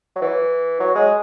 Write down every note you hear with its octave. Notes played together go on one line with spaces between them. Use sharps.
F#3
E3
F#3
G#3